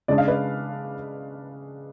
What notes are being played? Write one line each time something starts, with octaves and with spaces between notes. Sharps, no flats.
C#3 G#3 D4 D5
F5
B4 D5